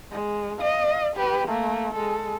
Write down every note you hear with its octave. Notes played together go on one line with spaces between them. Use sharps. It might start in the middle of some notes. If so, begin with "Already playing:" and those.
G#3
D#5 F5
G4 B4
A3 A#3
G#3 A4